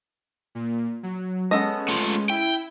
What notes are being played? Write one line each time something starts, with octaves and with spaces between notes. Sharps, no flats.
A#2
F#3
G#3 B3 C#4 A4 D#5
A3 F4
E4 G5